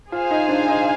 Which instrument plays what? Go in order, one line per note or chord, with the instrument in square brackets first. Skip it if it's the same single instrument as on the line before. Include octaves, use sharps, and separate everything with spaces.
[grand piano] F4 [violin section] G#4 C5 F5 G#5
[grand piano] D#4
D4
D#4